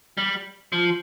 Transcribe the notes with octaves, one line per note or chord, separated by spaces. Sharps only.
G3
F3